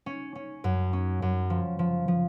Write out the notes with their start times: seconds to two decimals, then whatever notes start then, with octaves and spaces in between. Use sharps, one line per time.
0.06 C#4
0.35 C#4
0.64 F#2
0.93 C#4
1.22 F#2
1.50 F3
1.79 F3
2.08 F3